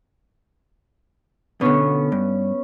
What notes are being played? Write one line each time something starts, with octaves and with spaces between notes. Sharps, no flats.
B2 D3 B3 C#4 C#5
G2